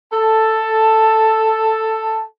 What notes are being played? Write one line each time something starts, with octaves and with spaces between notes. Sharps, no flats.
A4 A5